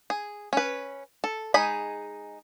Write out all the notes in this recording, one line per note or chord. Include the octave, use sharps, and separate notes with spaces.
G#4
C#4 B4
A4
G#3 D#4 G#4 B5